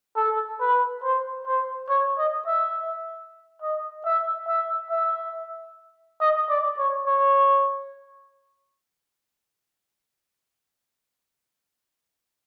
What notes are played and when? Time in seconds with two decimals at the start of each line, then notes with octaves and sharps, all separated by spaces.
0.16 A4
0.60 B4
1.03 C5
1.46 C5
1.89 C#5
2.18 D#5
2.47 E5
3.62 D#5
4.05 E5
4.48 E5
4.91 E5
6.21 D#5
6.49 D5
6.78 C#5
7.06 C#5